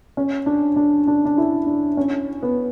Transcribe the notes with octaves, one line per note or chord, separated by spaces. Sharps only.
C#4
D4
D4
D4
D4
E4
D4
C#4
B3